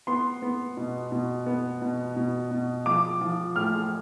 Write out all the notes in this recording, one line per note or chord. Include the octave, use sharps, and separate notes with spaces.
B3 C6
B3
B2
B2
B3
B2
B2
B2
F3 D6
F3
A2 F6